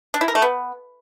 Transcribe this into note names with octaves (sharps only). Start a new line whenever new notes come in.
D4
E4
A#4
A3
B3